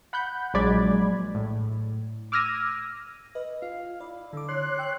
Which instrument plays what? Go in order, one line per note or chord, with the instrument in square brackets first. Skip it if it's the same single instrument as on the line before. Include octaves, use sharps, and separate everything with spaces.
[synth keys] F#5 B5 F#6 G6
A#1 F#3 G#3 D5 B5 G#6
A2
D6 E6 F6 G#6 A#6 D#7
[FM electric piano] B4 D#5
[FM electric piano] F4 [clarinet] F5
[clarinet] E4 [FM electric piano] D5
[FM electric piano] D3 D6 [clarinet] A4
[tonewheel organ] C#5 F#6 [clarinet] C6
[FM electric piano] G5 E6